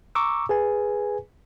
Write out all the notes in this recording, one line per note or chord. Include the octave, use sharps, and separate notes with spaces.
A#5 C#6 D6 E6
G#4 B4 G#5